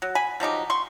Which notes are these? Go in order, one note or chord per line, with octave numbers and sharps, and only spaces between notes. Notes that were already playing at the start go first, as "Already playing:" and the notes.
F#3
G#5 B5
F3 F#3 D#4 G4
C6 C#6